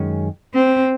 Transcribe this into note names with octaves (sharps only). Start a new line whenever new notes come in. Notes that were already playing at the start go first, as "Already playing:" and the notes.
Already playing: F#2 D#3 G#3 C#4
C4